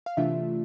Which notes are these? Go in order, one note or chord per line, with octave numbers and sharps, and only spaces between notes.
F5
C3 E3 A3 D4 F4 E5